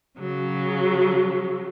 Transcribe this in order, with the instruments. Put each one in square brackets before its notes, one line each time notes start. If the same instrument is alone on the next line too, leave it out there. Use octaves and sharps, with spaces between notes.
[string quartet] C#3 F#3